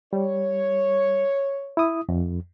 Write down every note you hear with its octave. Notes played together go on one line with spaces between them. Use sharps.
G3 C#5
E4 D#6
F2